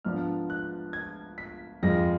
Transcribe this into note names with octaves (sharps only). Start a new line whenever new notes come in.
G#2 F3 B3 D4 F6
F#6
G#6
B6
F2 F3 G#3 A#6